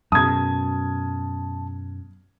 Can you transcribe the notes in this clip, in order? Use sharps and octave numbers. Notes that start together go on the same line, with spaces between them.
F#2 B2 A5 D#6 G#6